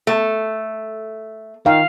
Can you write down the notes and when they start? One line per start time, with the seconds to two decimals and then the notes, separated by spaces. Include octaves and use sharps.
0.07 A3
1.66 D#3 F5